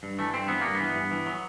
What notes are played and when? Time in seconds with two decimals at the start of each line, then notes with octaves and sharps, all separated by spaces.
0.03 G2
0.19 E3 A3
0.34 G2 C4
0.48 E3 B3
0.61 G2 A#3
0.75 B3
0.80 E3
0.95 G2
1.11 E3
1.26 F#3